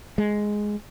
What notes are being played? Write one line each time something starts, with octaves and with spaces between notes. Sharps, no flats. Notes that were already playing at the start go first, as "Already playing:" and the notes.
G#3